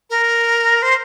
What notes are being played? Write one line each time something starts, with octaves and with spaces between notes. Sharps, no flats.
A#4
C5